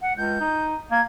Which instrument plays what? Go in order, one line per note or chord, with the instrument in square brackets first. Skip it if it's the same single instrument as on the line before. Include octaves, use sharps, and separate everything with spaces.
[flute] F#5
[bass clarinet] C#2 [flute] G6
[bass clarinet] D#4
[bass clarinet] A#3 [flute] G#6